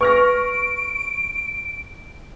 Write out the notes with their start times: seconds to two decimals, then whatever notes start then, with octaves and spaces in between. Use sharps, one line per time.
0.01 B4 C#6 F6 A#6 D7